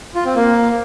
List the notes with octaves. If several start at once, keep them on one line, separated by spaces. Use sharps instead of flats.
F4
C4
A#3